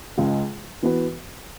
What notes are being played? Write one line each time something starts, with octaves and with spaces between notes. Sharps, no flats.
C#2 C#3 G#3
E3 B3 F#4 B4